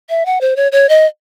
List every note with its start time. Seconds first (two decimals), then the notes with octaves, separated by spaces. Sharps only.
0.10 E5
0.26 F#5
0.41 C5
0.56 C#5
0.72 C#5
0.89 D#5